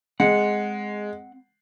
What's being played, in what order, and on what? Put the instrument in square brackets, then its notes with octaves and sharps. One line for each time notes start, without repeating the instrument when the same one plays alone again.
[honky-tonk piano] G#3 [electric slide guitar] C4 F#5